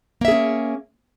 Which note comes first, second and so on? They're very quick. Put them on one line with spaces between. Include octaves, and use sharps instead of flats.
A#3 E5 G#4 C#4